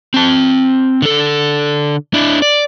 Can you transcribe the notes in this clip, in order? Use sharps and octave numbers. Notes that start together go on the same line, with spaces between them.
C4 A5
D3 A4
D4 E4
D5